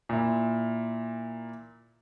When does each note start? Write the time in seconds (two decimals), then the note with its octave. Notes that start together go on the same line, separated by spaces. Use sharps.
0.09 A#2 E4